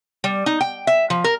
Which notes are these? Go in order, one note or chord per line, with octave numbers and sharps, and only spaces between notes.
G3
D#4
G5
E5
F3
A#4